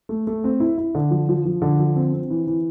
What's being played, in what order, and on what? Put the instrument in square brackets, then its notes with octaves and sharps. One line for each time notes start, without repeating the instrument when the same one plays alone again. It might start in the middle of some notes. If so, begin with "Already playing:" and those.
[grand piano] A3
A3
C4
E4
E4
D3
F3
F3
F3
D3
F3
C4
C4
E3
E3